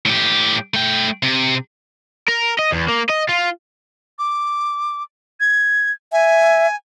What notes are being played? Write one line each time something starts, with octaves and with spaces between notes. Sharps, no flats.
A2 G4
A3 G5
C3
A#4
D#5
E2
A#3
D#5
F4
D6
G#6
E5 G#5